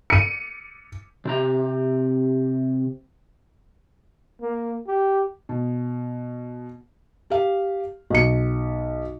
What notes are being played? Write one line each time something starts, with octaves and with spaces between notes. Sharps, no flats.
C#7 D#7
C3 G4 A#5
A#3
G4
B2
G4 F5
B1 C#7